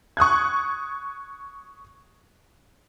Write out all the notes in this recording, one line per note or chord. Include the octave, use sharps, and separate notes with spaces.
C#6 D#6 F#6 G#6